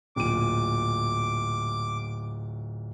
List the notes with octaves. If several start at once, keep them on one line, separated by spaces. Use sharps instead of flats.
D1 A#2 D6 D#7